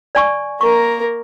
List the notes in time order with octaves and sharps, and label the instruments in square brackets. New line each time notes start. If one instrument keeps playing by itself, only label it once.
[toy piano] D5 G#5 C#6
[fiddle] A#3 A#4 [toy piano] C#6